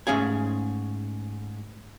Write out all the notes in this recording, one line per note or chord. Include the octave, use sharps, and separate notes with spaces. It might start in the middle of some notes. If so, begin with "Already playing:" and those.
G#2 A3 C#4 G#4 F5 G#5